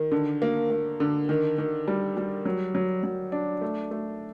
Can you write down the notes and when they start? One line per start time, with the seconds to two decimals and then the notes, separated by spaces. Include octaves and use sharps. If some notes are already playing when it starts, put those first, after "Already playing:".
Already playing: D#3
0.12 D3
0.42 A#3
0.70 A#3
1.00 D3
1.29 D#3
1.58 D#3
1.88 G3
2.17 G3
2.45 F#3
2.75 F#3
3.03 F#3
3.32 D4
3.61 A3
3.91 A3